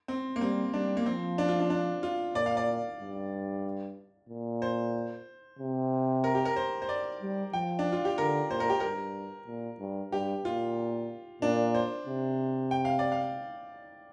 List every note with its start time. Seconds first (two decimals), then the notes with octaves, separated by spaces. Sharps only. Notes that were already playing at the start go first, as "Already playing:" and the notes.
0.08 C4
0.36 A#3
0.41 G3 C4
0.74 G3 D4
0.97 A#3
1.06 F3 C4
1.38 D4
1.49 F4
1.60 D4
1.70 D4
2.03 F4
2.35 A#2 D5
2.46 F5
2.57 D5
3.00 G2
4.29 A#2
4.62 C5
5.59 C3
6.24 A#4
6.35 G4
6.45 A#4
6.56 C5
6.82 C5
6.89 D5
7.22 G3
7.53 F3 G5
7.79 D4
7.92 F4
8.05 G4
8.18 D3 A#4
8.50 A#2 C5
8.60 A#4
8.70 G4
8.80 G2 A#4
9.47 A#2
9.80 G2
10.12 G2 G4
10.45 A#2 F4
11.42 A#2 D4
11.75 C5
12.07 C3
12.71 G5
12.85 F5
12.99 D5
13.12 F5